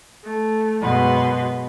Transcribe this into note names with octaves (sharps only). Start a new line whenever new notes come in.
A3
F#2 B2 G#3 B4 C6